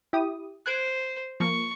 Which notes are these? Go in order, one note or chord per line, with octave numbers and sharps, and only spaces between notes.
E4 G4 D#6
C5 F#6 G#6 D7
F3 A#3 C#6